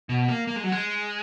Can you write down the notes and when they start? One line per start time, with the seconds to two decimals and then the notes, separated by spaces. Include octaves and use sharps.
0.09 B2
0.29 A#3
0.47 A#3
0.56 G#3
0.64 F#3
0.72 G#3